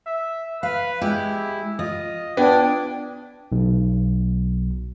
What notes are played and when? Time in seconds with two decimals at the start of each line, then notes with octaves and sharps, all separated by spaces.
0.06 E5
0.63 B4 F5
1.02 G#3 E4 G4
1.79 F4 D#5
2.37 B3 D4 G5 G#6
3.52 B1